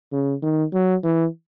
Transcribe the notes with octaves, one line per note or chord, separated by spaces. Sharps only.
C#3
D#3
F#3
E3